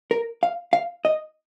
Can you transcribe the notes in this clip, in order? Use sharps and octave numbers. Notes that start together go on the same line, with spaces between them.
A#4
F5
F5
D#5